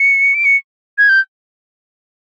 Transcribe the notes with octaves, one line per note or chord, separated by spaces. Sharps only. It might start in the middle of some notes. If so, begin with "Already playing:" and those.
Already playing: C#7
D7
C#7
G#6
G6